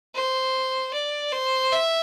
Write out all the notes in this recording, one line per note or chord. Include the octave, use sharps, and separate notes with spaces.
C5
D5
C5
E5